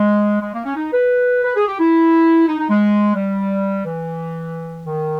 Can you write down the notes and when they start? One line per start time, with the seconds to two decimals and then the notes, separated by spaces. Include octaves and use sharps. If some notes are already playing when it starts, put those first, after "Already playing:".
Already playing: G#3
0.41 G#3
0.53 A#3
0.65 C#4
0.75 D#4
0.92 B4
1.44 B4
1.56 G#4
1.67 G4
1.79 E4
2.48 D#4
2.58 D#4
2.69 G#3
3.15 G3
3.84 E3
4.86 D#3